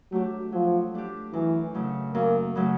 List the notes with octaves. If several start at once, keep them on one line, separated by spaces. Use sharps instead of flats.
F#3 A3 D4 G4
F3 F#3
A3 D4 G4
F#2 E3
C#3 F#3 A3
F#2 A#3
C#3 F#3 A3